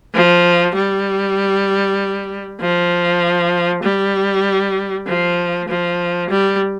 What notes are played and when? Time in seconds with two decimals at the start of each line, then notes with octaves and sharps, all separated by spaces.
0.14 F3
0.75 G3
2.61 F3
3.83 G3
5.07 F3
5.68 F3
6.30 G3